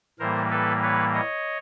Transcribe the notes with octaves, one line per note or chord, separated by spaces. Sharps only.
A2 E3 G3 A#3 A#4 C5
A4 B4
B4 C#5
C#5 D#5